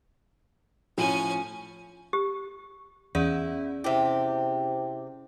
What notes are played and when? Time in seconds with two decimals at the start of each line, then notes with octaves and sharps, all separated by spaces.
0.97 A2 F3 C#4 G#5
2.13 G4
3.15 E2 C#4 E4 G#4 D5
3.84 C3 E4 G4 C5 E5